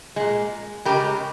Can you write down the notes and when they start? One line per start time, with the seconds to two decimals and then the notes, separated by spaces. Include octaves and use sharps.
0.16 A#2 G#3
0.85 C#3 G#3 G4 A#4